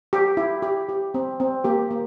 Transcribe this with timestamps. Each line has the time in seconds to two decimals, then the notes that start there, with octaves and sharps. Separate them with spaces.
0.13 G4
0.37 E4
0.62 G4
0.89 G4
1.14 C4
1.40 C4
1.64 A#3 G4
1.91 A#3